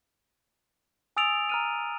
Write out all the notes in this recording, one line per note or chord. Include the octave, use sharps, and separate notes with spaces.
G#5 D#6 E6 A6 D7 F7
A#5 F6 D#7